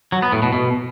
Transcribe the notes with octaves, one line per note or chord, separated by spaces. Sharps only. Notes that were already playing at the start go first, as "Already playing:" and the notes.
F#3
B3
A2
B2
B2